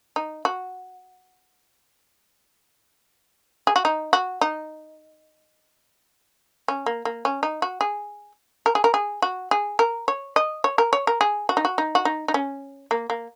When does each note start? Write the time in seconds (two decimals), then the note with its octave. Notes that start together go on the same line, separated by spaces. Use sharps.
0.16 D#4
0.45 F#4
3.67 G#4
3.76 F#4
3.85 D#4
4.13 F#4
4.41 D#4
6.68 C#4
6.86 A#3
7.05 A#3
7.25 C#4
7.43 D#4
7.62 F#4
7.81 G#4
8.66 A#4
8.75 G#4
8.84 A#4
8.94 G#4
9.22 F#4
9.51 G#4
9.79 A#4
10.08 C#5
10.36 D#5
10.64 C#5
10.78 A#4
10.93 C#5
11.07 A#4
11.21 G#4
11.49 F#4
11.57 D#4
11.65 F#4
11.78 D#4
11.95 F#4
12.05 D#4
12.28 D#4
12.34 C#4
12.91 A#3
13.10 A#3